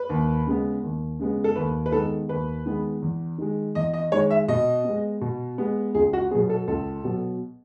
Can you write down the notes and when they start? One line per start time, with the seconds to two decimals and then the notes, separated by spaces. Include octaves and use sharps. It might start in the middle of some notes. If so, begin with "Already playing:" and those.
Already playing: B4
0.09 D#2
0.47 C#3 G#3 B3
0.83 D#2
1.19 C#3 G#3 B3
1.44 A4
1.56 D#2 B4
1.86 B4
1.92 D#3 G#3 B3 A4
2.29 D#2 B4
2.66 D#3 G#3 B3
3.02 E2
3.38 D#3 G#3
3.75 E2 D#5
3.94 D#5
4.12 D#3 G#3 C#5
4.30 E5
4.48 B2 D#5
4.85 G#3 B3
5.21 B2
5.58 G#3 B3
5.95 C#2 G#4
6.13 F#4
6.31 B2 F#3 B3 G#4
6.50 A4
6.68 C#2 A4
7.04 B2 F#3 B3